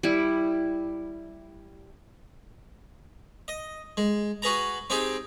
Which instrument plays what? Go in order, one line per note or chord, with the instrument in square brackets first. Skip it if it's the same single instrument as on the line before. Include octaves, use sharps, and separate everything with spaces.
[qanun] G3 E4
[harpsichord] D#5
G#3
F#4 G#4 B4 A#5
C4 D#4 G4 G#4